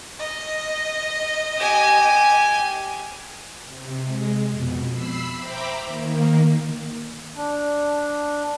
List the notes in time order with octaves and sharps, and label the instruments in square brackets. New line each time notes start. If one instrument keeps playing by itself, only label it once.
[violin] D#5
[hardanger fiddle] G4 G#5
[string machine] C3
G#3
F2 B2
B5 E6 C7
C5 E5 G5 A#5 B5 D6
D#3 A#3
[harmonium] D4